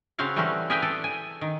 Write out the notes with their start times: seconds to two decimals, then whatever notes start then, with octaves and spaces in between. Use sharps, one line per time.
0.19 C#3 C4 F#4 C#5 F5
0.36 E3 G3 A3 C4 C#4 F#4
0.70 G#4 A#4 B4 E5 G5 G#5
0.82 A4 D5
1.04 G#5
1.41 D#3